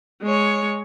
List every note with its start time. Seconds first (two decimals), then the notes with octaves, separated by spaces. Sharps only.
0.22 G#3 C#5